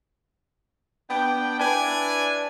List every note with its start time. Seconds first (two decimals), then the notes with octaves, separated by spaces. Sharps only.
1.10 B3 D4 G5
1.60 D4 E4 B4 D5 G#5